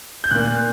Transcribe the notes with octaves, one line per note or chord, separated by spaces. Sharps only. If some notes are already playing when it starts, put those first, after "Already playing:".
G6
A#2 A#3 F#6